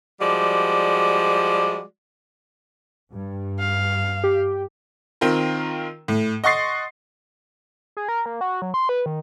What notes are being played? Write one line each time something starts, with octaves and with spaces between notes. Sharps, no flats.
F3 G3 G#3 F#4 D5
G2
F5
G4
D#3 C4 F4 A#4
A2
D#5 F#5 C6 C#6 A6 C7
G#4
A#4
A#3
F#4
F#3
C6
B4
D#3